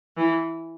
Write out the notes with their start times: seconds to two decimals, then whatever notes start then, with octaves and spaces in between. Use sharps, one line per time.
0.17 E3